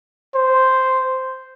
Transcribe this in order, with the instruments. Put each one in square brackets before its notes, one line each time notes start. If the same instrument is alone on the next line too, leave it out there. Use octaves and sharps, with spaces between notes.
[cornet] C5